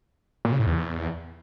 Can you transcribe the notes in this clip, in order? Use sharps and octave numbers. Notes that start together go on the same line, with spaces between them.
A#2
C#3
A2
E2